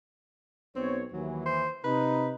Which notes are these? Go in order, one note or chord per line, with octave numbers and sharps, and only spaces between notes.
B1 C4 C#5
D#2 E3 F#3
C5
C3 D#4 B4